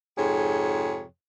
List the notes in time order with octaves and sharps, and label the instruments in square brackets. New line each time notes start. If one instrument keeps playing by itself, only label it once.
[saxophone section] F2 G#2 C3 G#4 C#5